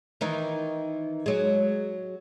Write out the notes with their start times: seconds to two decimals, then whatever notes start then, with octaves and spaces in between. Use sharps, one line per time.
0.21 D#3 E3 D#4
1.26 F#3 G#3